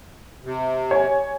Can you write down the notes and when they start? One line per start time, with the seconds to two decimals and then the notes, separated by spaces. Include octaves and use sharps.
0.44 C3
0.91 C#5 G#5